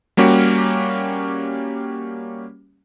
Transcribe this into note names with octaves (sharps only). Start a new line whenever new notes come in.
G3 A#3 C#4 F#4 G4